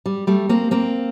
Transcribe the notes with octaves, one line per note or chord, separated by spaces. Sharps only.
G3
G3 A3
A#3 C4
A#3 C4